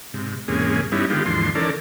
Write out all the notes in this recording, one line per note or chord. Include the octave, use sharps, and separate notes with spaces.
G#2 C3
E2 G#2 C3 A#3 C#4 G#4
G2 G3 B3 C#4 D#4 E4
D3 D#3 G#3 B3 F4 G4
D#2 G#2 D3 E3 F3 C6
D#3 E3 C#4 A4 A#4 D5